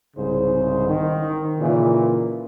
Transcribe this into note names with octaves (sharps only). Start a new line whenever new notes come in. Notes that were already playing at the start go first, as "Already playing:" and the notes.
C2 G#2 C#3 C5
D#3
A#2 C#3 E3